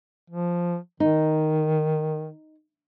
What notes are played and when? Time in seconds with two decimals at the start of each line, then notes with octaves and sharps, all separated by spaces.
0.30 F3
1.00 D#3 D#4